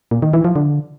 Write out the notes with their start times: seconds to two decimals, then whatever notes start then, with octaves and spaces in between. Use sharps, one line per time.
0.11 A#2
0.22 D#3
0.33 E3
0.45 F3
0.56 D3